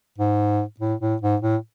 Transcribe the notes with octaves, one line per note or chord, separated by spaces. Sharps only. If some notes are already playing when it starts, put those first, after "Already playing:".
G#2
A2
A2
G#2
A2